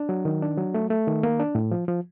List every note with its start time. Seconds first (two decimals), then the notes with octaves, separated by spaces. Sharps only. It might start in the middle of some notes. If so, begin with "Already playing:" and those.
Already playing: D4
0.09 F#3
0.25 D#3
0.42 D4
0.58 F#3
0.74 A3
0.90 A3
1.07 D#3
1.23 A#3
1.40 D4
1.55 A2
1.71 F3
1.88 F3